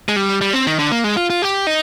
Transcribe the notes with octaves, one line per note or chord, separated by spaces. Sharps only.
G#3
G3
G3
C4
D#3
D3
A#3
G#3
F4
F4
G4
D#4